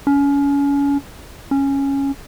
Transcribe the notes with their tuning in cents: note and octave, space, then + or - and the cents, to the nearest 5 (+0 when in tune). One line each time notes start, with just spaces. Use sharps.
C#4 +30
C#4 -5